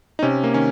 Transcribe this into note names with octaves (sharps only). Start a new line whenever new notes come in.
D#4
C3 C#4
A#3
D#3 C#4